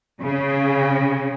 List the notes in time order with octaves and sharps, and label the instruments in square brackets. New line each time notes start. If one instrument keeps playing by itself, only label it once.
[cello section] C#3